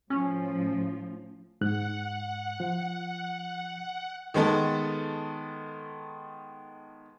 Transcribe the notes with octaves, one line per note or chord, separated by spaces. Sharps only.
A2 F3 C#4
G#2 F#5 F#6
F3
D#3 G#3 B3 A4